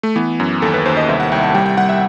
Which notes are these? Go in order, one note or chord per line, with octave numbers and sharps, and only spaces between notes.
A3
E3 B3
F#2
D#2 A4
B4
D#2 C5
D#5
C2 E5
F#5
C2 G5
A5
G3 G5
G5
G3 F#5
E5